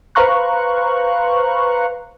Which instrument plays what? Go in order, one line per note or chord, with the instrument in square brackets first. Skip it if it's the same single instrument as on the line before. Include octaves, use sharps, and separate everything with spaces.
[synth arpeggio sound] B4 C5 F5 A#5 C#6 F#6